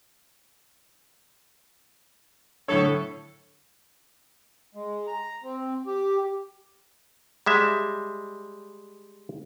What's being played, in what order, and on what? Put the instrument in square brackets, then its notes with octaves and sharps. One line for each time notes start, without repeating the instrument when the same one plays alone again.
[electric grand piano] A2 C#5 [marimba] D3 F#3 D4 [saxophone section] A4
[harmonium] G#3
A#5
C4
G4
[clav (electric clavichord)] G3 G#3 E5